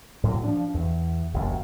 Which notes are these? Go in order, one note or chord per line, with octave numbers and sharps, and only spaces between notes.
A2 F#3
F3 D4
E2
F#1 D#2